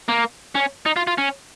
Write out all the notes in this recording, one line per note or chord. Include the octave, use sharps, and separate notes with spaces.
A#3
C#4
D#4
F4
F4
C#4